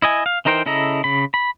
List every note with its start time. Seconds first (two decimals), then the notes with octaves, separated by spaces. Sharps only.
0.02 E4 D#5 G#5
0.26 F5
0.45 E3 D#4 A#4 C5 G5
0.66 C#3 E4 A4 D#5 A#5
1.04 C#3 B5
1.34 B5